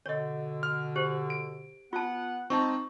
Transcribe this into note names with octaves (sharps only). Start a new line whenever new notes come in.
B2 D3 C#5 D#5
F6
G4 C5
D7
B3 F4 F#5 A5
G#3 C4 D#4 A5 C#6